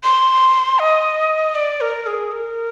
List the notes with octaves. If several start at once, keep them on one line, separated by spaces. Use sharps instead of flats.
C6
D#5
D5
A#4
G#4
A#4